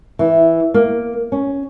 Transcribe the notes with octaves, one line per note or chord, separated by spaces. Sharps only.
E3
A#3
C#4